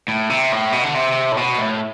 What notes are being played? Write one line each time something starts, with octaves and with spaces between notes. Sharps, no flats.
A2
C3
A2
B2
D3
C3
A2
B2
A2